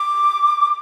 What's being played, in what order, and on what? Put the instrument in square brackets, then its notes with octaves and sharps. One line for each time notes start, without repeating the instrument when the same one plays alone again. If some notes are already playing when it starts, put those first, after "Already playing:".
Already playing: [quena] D6